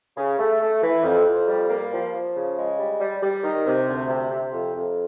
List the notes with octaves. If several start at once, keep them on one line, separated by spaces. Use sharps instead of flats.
C#3
A3
A3
E3
F2
F2
G3
A#3
F3
F3
C#3
G#3
G3
G3
G3
D#3
C3
D2
C3
C3
F2
F2